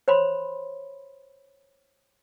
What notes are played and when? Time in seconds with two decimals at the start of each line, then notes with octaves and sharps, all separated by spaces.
0.08 C5 C#5 B5 C6